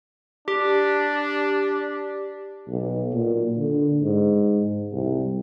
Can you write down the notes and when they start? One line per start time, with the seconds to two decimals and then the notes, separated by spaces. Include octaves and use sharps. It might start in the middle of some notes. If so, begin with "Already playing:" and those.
0.48 D4 G4
2.68 B1
3.13 A#2
3.58 D3
4.02 G#2
4.92 C2